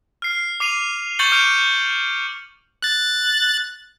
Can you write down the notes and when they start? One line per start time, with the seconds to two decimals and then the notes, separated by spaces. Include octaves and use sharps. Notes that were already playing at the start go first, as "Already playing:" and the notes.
0.22 F6 C7
0.60 D6 C7 D#7 F7
1.19 C#6 G6 A6 C#7 F#7 G7
1.32 D6 F6 G6 D7
2.82 F#6 A6